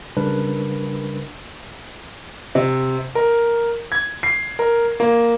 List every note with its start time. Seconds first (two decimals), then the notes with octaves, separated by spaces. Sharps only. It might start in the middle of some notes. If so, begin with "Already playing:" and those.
0.17 C#3 G3 D4 A#4 B4
2.55 C3
3.15 A#4
3.92 G#6
4.23 C7
4.59 A#4
5.00 A#3